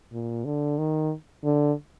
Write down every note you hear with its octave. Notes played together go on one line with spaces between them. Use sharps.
A#2
D3
D#3
D3